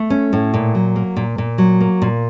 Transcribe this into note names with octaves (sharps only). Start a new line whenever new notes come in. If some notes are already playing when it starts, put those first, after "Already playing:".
Already playing: A3
C#4
A2
A#2
F#3
A#3
A#2
A#2
F#3
A#3
A#2